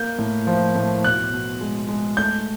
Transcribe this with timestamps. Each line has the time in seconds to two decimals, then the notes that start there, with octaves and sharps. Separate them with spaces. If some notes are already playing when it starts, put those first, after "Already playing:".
Already playing: A#3 G6
0.19 A2
0.47 F3
0.75 A2
1.04 B2 F#6
1.33 B2
1.61 G#3
1.89 G#3
2.17 A3 G6